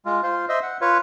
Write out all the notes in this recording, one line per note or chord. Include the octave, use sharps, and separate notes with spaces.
G#3 F4
F4 C5
C5 D#5 E5
F#5
F4 B4 C#5